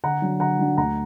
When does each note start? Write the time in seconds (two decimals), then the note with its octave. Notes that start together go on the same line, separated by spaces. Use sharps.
0.04 D3 F#5 A#5
0.22 F#3 D4
0.40 D3 F#5 A#5
0.59 F#3 D4
0.77 D2 F#5 A#5